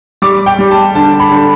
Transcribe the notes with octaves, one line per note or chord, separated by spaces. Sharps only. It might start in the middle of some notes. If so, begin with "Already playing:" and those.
G3 D6
G5
G3
A5
D3 A5
B5
D3